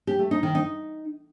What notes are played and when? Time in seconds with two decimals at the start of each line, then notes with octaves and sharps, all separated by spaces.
0.07 G4
0.19 A3
0.31 D#4
0.43 D#3
0.55 D#4